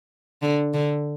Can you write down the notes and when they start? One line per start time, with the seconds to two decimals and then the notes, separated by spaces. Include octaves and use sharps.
0.42 D3
0.74 D3